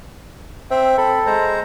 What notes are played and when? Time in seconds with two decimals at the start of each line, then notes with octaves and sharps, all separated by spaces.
0.71 C4 E5 G5
0.98 C4 A4 B5
1.26 G#3 C5 A#5